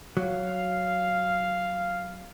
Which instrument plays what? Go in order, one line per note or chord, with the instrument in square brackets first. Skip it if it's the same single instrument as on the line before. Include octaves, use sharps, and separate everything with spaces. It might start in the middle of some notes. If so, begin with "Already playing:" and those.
[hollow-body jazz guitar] F#3 [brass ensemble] F5